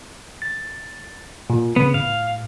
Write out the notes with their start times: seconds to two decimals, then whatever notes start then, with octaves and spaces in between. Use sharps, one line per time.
0.42 A6
1.50 A#2
1.76 C#3 B3
1.94 A2 F5